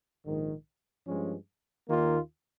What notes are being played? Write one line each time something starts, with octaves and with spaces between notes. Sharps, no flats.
A#1 G#2 D#3
G2 F3 G#3 C#4
D#2 D#3 A#3 F4